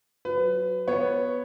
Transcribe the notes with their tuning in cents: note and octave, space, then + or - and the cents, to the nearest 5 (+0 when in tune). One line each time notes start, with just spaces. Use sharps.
F#3 +0 B4 +25
B3 +0 C#5 +0